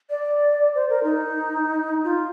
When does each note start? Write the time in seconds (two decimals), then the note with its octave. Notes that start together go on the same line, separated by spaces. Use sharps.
0.10 D5
0.75 C5
0.89 A#4
1.04 D#4
2.04 F4